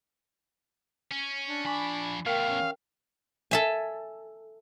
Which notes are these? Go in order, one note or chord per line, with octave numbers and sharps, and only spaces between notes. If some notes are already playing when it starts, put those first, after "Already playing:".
C#4
D4
F3 G#5 B5 C#6 D6
E2 A3 A#4 F5 G5
C#4
A4 E5 G#5